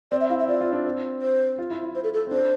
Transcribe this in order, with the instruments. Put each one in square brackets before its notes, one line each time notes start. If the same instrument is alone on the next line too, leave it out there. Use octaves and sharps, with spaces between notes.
[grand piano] C4 [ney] D5
[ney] E5
[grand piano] E4 [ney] F5
[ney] E5
[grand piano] F4 [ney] D5
[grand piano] F4
D4
C4
[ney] C5
[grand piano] F4
E4
E4
[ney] C5
A4
A4
[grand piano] C4
[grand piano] D4 [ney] C5